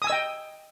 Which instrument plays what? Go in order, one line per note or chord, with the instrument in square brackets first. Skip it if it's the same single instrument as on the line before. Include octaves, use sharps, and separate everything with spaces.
[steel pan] D#6
G#5
E6
D#5
G5